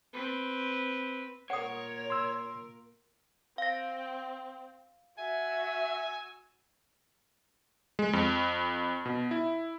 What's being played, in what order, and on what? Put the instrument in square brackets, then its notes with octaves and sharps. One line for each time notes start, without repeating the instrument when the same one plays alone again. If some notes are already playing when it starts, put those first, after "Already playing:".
[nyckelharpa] C4 B4
[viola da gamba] A#2 F4 A#4 [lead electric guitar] C#5 [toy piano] F#5 D#6
[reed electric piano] C6 E6
[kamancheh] C4 [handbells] F5 A#6
[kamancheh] F#4 E6 [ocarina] E5 [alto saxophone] G#5
[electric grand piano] G#3
F2
B2
E4